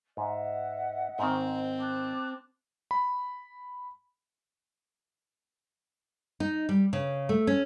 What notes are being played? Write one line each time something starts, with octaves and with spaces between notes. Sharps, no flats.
G#2 D#5 E5 F#5
G#2 D#3 C4
A5 D6 F#6
B5
D#4
G3
C#3
A3
C#4